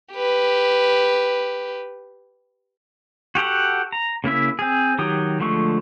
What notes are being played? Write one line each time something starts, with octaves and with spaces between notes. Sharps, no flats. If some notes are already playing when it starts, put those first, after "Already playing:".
G4 B4
F#4 G4 A4 F#5
A#5
C#3 A#3 E4 E5
C4 G#4
D#3 F#3 G4 D#6
D3 F3 G#3 A3 C#6